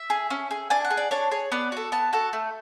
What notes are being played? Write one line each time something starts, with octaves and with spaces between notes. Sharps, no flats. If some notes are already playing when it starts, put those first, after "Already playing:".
Already playing: E5
G#4
C#4
G#4
D4 G#5
F#5
G#4
D5
D4 C#5
G#4 C#5
B3 D5
F#4 A4
B3 A5
F#4 A4
A3